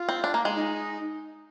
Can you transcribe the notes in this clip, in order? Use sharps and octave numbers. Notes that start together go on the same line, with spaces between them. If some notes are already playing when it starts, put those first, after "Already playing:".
Already playing: F4
C4
D4
A#3
G#3
D#4